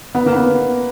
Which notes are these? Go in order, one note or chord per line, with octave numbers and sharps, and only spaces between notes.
B3
A#3
B3